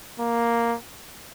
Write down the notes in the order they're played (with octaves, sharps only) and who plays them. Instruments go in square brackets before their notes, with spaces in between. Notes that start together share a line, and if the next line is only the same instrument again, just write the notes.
[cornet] A#3